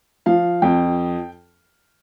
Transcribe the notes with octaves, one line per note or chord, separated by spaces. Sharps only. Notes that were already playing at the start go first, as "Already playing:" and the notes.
F3 F5
F2 G5